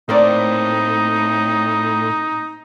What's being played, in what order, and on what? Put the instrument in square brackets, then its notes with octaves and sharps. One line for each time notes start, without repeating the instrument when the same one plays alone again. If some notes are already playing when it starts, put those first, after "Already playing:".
[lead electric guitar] A2 [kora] A#3 C4 D5 [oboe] D#4